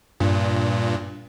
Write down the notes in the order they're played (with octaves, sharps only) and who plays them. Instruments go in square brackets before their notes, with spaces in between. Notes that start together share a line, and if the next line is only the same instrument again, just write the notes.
[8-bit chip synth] G2 A#2